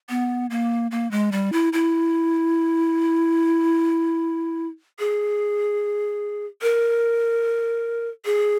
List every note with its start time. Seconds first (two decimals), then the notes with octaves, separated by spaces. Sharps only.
0.09 B3
0.50 A#3
0.91 A#3
1.11 G#3
1.32 G3
1.52 E4
1.73 E4
4.99 G#4
6.62 A#4
8.25 G#4